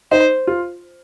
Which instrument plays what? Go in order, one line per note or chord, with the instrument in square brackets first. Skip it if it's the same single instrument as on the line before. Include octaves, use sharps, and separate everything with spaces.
[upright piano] D#4 [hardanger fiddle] C5
[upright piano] F4